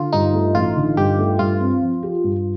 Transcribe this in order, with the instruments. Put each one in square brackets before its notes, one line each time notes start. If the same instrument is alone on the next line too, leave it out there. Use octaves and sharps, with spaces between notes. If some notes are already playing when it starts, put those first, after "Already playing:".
Already playing: [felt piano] D3 [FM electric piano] F4
[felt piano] G2 [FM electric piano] D#4
[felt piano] A3
[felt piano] A1 [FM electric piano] F4
[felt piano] D3
[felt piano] G2 [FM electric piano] G4
[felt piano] A3
[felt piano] G2 [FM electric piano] F4
[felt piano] C4
F3
G4
G2